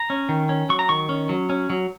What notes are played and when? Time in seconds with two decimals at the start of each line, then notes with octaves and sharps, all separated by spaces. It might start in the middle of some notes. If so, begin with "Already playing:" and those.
Already playing: A#5
0.10 C#4
0.29 D#3
0.49 C#4
0.69 F#3 C#6
0.79 A#5
0.89 D#3 C#6
1.09 C#4
1.29 F#3
1.50 C#4
1.70 F#3